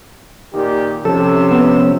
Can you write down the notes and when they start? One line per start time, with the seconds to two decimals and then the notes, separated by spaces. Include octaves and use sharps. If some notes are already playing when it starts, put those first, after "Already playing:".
0.53 A#2 D#3 G4
1.05 C3 F3 C#4 A4 E6
1.51 B3